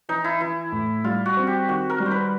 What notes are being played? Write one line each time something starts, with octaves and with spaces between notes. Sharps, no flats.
E3 D#4
E4
E3 E4
A2
G3 F4
F#4
C4
G4
D#3 F#4
A#4
G3
C5
B4